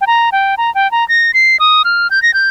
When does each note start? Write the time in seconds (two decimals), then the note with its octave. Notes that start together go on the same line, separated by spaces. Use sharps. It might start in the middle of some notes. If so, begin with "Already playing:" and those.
0.01 G5
0.07 A#5
0.32 G5
0.57 A#5
0.75 G5
0.91 A#5
1.08 A#6
1.34 C7
1.60 D#6
1.85 F6
2.11 G6
2.22 A#6
2.34 G6